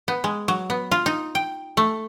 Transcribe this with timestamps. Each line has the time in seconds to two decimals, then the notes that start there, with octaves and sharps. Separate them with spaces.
0.08 B3
0.24 G#3
0.48 F#3
0.70 B3
0.91 F4
1.06 D#4
1.35 G5
1.77 A3